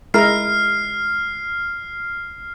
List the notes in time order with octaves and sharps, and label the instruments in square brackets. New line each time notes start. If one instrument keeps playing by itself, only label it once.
[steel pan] G#3 E4 A#4 [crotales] F6 C7